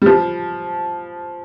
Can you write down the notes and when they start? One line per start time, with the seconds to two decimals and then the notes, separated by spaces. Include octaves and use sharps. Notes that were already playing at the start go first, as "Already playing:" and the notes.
0.02 G3
0.06 F3